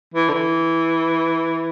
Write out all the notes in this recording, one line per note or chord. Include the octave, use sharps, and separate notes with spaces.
E3
D3
E3